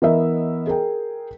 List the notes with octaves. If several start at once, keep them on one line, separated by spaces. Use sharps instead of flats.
E3 B3 A#4 D#5 E5
G#4 A#4 G5